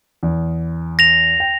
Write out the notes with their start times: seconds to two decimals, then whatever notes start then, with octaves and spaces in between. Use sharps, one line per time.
0.23 E2
0.99 A#6 F7
1.40 G5